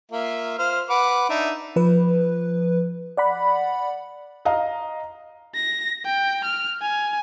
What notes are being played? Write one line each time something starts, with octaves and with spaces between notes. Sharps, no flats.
A#3 F4 E5
F4 C5 F6
B4 F#5 D6
D4 D#4 E5
F3 B4
D5 F#5 B5
D#5 F5 A#5
A#6
G5
F6
G#5